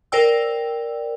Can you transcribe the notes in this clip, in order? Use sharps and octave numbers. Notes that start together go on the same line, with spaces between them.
A#4 C5 D5 G5 E6